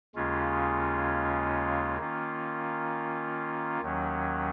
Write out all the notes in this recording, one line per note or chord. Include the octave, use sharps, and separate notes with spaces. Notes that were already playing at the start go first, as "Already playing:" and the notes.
D#2 C#3 G#3 C#4 F4
D#3 A#3 C#4 F4
D#2 D#3 F#3 C#4